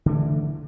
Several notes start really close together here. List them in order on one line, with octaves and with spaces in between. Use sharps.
D3 A3 E3